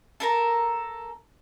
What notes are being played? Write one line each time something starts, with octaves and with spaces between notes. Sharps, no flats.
A4 A#4 A#5